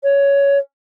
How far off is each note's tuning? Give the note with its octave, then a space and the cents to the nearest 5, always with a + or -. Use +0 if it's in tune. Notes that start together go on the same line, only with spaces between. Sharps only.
C#5 +15